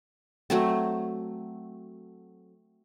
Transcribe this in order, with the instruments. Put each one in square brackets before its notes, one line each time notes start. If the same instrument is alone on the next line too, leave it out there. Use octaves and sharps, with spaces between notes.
[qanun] F#3 A3 C4